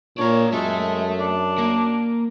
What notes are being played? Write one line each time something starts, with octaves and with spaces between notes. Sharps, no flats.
A#2 D4 A#4 C#5
F#2 G#3 A4 E5
D4
A#3